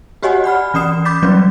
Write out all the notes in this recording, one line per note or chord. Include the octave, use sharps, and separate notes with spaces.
F#4 G4 C#5 D#5 F#5 G#5
D5 F#5 B5 F6
E3 C#4 D5 D#6 C7 E7
B5 D6 G6 A6 B6
F#3 G3 C#4 B4 D5